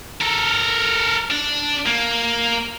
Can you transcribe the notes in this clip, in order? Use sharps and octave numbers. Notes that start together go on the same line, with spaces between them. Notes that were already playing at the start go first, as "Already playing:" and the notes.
A4 A#4
D4
A#3